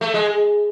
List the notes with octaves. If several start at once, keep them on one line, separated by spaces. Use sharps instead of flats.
A3
G#3